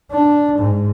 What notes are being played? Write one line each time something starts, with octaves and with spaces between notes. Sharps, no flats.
D4
G#2